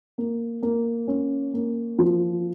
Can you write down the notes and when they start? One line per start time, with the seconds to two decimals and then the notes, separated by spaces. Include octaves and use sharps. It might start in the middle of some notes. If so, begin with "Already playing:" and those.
0.18 A#3
0.63 A#3
1.07 C#4
1.54 A#3
1.98 F3